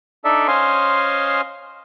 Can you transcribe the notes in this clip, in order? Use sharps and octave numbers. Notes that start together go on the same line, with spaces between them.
D4 D#4 A4 D5 E5
C#4 C5 D#5 F5 G#5 C6